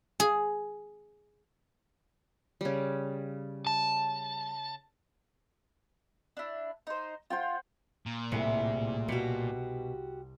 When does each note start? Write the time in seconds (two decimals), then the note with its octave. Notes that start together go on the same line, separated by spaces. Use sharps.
0.20 G#4
2.61 C#3 G3
3.67 A5
6.37 D4 E4
6.87 D#4 C5
7.30 F4 C5 F#5 G5
8.06 A#2
8.32 C2 A2 C3 G#4 E5 F#5
9.08 B2 F#4 G4